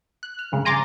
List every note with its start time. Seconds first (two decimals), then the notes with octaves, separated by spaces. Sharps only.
0.23 F#6
0.39 F6
0.52 G2 C#3 G#3
0.65 G#5 A#5 C6 D6 A6